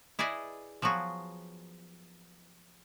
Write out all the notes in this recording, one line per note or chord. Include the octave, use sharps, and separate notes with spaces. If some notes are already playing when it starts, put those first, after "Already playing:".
E4 G#4 B4 D5 D#5
F3 F#3 B3 F#4 G#4